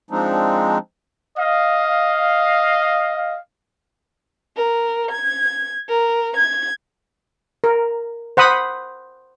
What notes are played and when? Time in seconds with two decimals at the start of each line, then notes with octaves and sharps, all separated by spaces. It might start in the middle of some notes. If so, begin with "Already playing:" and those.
0.11 F3 G#3 C4 D4 D#4
1.38 D#5 F5
4.56 A#4
5.11 G#6
5.89 A#4
6.36 G#6
7.64 A#4
8.37 C5 F#5 B5 D#6